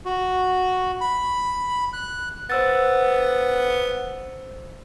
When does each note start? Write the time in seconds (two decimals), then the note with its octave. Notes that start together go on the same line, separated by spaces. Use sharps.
0.05 F#4
1.01 B5
1.93 F#6
2.50 B3 C5 E6 A6